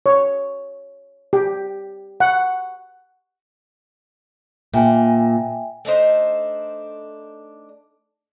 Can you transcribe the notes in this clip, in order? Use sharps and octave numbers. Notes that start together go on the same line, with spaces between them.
C#5
G4
F#5
A#2 E5 G5 G#5
A3 D4 D#4 C5